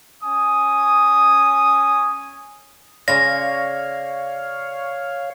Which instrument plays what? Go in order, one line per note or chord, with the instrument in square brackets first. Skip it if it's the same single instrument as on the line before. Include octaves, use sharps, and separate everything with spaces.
[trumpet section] C#4 G#5 D#6
[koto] C#3 F4 [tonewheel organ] C#5 F5 [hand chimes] D5 [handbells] A#6